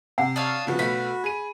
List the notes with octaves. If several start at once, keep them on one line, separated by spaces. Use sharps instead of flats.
C3 F#5
D4 C#5 F5 A5 D#6 E6
C#3 F3 B3 F#4
B1 A3 B4 B5
G#4 D#7